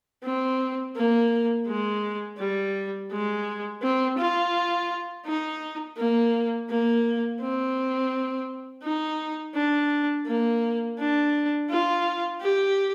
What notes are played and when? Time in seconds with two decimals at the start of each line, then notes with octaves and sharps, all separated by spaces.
0.24 C4
0.96 A#3
1.67 G#3
2.39 G3
3.12 G#3
3.82 C4
4.18 F4
5.26 D#4
5.97 A#3
6.69 A#3
7.41 C4
8.84 D#4
9.55 D4
10.26 A#3
10.99 D4
11.70 F4
12.41 G4